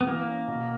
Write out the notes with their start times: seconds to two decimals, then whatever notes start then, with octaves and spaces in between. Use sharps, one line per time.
0.01 B3
0.07 E3 A#3
0.28 C#4
0.48 B2